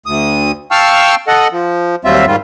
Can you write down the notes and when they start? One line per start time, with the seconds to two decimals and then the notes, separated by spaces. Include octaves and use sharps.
0.06 D2 D#6
0.71 F5 G5 A5 C#6 E6 F6
1.28 A4 D#5 F#5
1.51 F3
2.05 D#2 F#3 G3 C4 F4 E5
2.27 G#2 D#3 G3 F4